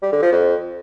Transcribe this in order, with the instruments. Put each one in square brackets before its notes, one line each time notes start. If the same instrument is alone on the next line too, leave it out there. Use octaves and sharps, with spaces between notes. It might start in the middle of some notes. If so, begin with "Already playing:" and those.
[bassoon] G3
D3
F3
F2